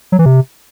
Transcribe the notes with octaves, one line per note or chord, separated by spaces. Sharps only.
F#3
E3
C3